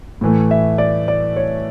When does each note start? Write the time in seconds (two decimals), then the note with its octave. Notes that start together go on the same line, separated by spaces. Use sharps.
0.21 A2 E3 A3
0.51 E5
0.78 D5
1.08 D5
1.36 C#5